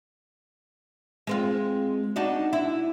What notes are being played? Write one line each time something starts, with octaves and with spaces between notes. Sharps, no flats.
G#3 C4 F4
D4 D#4 F#4
E4